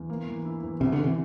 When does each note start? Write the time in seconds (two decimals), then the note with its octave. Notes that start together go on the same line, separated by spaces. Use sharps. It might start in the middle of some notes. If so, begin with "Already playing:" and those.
Already playing: E2
0.10 A#3
0.27 E3
0.45 E4
0.63 E2
0.80 C2 C3
0.92 D3
0.99 C3 E3